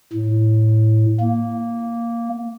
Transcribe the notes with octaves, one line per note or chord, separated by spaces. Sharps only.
A2
A#3